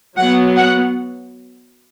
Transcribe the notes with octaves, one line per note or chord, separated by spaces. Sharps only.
F#3 B3 F#5
F#5